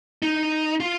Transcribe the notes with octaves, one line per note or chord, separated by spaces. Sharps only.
D#4
F4